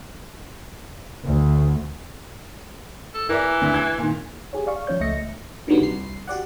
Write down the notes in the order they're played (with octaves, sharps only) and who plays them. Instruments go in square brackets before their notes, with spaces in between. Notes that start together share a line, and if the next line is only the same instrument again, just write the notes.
[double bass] D2
[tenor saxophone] A4
[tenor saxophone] E3 [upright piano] A#4 D5 E5
[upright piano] D2
G#5 G#6
A#2 D#3
[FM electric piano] G4 G#4 C#5
D5 F5 C#6
F3 C#4 C#5 G6
C#2 A3 D#5 E5 A#6 C#7
A#2 D3 D#3 F#3 G3 B3
C2 C7
F#4 G4 D5 F#5